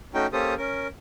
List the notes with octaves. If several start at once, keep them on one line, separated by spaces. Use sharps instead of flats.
A3 C#4 D#4 F#4 G5
A#3 C#4 G4 A4 C5 D#6
C#4 A#4